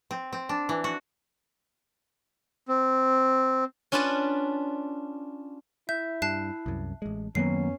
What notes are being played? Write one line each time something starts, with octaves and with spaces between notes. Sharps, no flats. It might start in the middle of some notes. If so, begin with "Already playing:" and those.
C4
C4
D4
E3
F#4
C4
C#4 D4 F4 B4 A5
E4 E5 G6
G2 A5 F#6 C7
C2 F#2
A1 G#3
F#2 D#3 F#3 G#3 A#3 B3 C#4 C7